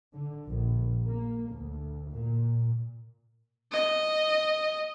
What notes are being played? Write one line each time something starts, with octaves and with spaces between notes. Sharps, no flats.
D3
A#1
A#3
D2
A#2
D#5